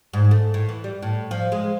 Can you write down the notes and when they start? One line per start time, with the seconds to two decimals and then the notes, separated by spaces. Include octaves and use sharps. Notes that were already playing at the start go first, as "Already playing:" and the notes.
0.13 G#2
0.31 A3
0.54 A2
0.69 E3
0.84 G3
1.03 A2
1.31 F3
1.52 G#3